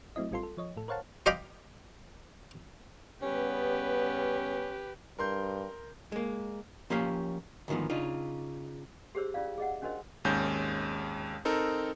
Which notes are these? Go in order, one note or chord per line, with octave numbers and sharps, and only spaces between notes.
F#3 A3 C4 E4 D#5
A1 G3 C4 F4 A4 C6
A4
F3 C#5 D#5
A2 A4
A#4 C5 C#5 F5 F#5 A5
C5 D#5 F5 G5 B5 D6
C#3 G3 B3 C#4 G4 B4
G2 A#4 C6 G6
G#3 A#3
F3 A#3 C#4 G4 C#5 F5
D2 G#2 D#3 F3 B3
C#3 D4 D#4 F4
G4 G#4 C5 C#5 E6
C#4 E4 F4 D5 F5
G#4 D#5 F#5
C#4 D4 F#4 A#4 C5 D#5
G#1 D#2 G#3 C#4 G6
C4 D#4 A4 A#4